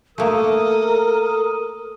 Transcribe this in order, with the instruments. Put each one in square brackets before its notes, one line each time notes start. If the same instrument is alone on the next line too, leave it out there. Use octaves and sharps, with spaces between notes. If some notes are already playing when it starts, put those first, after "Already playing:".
[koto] A3 A#3 [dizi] A4 [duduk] A#4 [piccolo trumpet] D#6